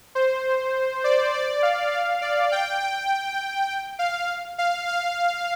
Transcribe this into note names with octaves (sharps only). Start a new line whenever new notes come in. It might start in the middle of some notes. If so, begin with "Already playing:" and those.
C5
D5
D5
F5
F5
D5
G5
G5
F5
F5
F5